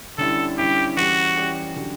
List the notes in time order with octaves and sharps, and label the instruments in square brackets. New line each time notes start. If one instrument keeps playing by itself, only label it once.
[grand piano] D3 G3 C#4 E4 [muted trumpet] A4
[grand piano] D3 G3 C#4 E4 [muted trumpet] G4
[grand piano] E3 G3 C#4 G4 [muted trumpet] F#4
[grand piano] E3 G3 C#4 G4
D3 F#3 C#4 G4